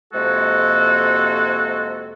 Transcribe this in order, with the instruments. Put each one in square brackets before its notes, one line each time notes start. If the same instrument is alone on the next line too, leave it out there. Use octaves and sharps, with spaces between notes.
[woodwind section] F2 C3 G#3 A#3 F#4 A4